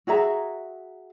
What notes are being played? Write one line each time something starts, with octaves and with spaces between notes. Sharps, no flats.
F#4 G#4 E5 A#5